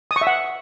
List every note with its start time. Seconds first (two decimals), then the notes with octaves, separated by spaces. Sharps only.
0.11 D#6
0.16 C#6
0.21 E5
0.27 F#5